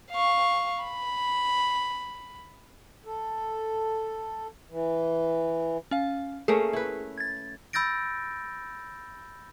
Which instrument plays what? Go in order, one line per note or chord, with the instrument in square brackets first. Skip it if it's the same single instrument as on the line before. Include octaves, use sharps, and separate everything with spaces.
[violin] F5 C#6
B5
[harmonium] A4
E3
[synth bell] C#4 F5
[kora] A3 A#3 C#4 [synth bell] G#4 A4
[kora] E4 B4
[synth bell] G#6 A6
[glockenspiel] B5 E6 G6 A6 A#6 D7